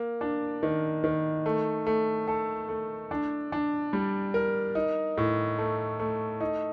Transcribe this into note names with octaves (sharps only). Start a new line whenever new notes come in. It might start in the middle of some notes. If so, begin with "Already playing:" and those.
Already playing: A#3
D4
D#3
D#3
A3
A3
A4
A3
D4
D4
G3
A#4
D#4
A2
A3
A3
D#4